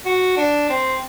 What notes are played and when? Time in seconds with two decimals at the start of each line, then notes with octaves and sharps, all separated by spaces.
0.05 F#4
0.37 D4
0.69 C4